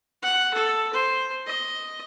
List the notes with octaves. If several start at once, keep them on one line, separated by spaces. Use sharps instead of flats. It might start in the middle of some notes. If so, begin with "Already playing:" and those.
F#5
A4
C5
D#5